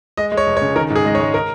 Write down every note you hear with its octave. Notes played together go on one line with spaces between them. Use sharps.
G#3 D#5
G#3
C#5
F1
C#5
C#3
D#3 A#4
G#2
G#4
G#3 D#5
C#5
G#3
A#4